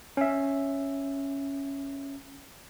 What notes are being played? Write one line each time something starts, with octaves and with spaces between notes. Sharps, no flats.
C#4 E5